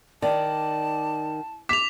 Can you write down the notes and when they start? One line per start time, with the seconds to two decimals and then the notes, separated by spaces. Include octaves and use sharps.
0.22 D#3 D5 A5
1.69 D6 B6 F7